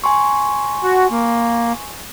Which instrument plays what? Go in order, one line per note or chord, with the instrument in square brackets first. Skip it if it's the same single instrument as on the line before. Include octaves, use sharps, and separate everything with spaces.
[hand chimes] G#5 C6 C#6
[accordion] F#4
A#3